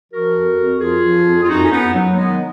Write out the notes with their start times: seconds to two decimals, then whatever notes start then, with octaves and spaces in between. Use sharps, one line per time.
0.13 F3 F#4 A#4
0.35 F2
0.58 F2
0.80 F3 F4 G#4
1.04 F3
1.26 F2
1.43 F4
1.48 F#2 D#4 F#4
1.61 C#4
1.71 F#2 B3 D#4
1.94 F#3
2.12 A#3
2.16 D#3 G#3 B3
2.28 D#4